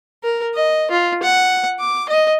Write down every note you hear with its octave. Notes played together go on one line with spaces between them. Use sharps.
A#4
D#5
F4
F#5
D6
D#5